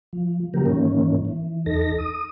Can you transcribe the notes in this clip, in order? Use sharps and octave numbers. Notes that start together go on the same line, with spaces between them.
F3
C#3 F3 F#3 A#3 G4 A#4
G#2 D#3 E3 A#3 C#4
E3
E2 D#4 A4 A#6
D#6